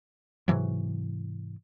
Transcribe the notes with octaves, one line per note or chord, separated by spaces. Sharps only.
G#2 C3 E3 F#3